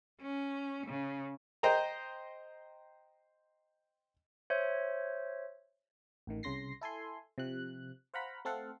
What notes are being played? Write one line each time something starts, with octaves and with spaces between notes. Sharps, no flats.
C#4
C#3
C5 D#5 G5 A#5
C5 C#5 E5
A1 A2 D#3
C2 C#3 C6 A#6 C7
E4 A4 G#5 C6
C3 F3 F#6
C5 F5 F#5 A#5 B5
A3 C4 A4 F5 F#5